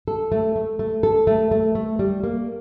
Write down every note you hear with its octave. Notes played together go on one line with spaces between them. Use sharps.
A4
A3
A3
A3
A4
A3
A3
A3
G3
A#3